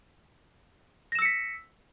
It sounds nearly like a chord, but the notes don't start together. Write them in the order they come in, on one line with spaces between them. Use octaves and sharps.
A#6 E7 E6 C#7 B6